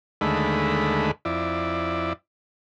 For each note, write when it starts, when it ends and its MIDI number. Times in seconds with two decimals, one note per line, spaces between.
0.21 1.11 39
0.21 1.11 50
0.21 1.11 56
0.21 1.11 57
0.21 1.11 83
1.25 2.13 41
1.25 2.13 64
1.25 2.13 74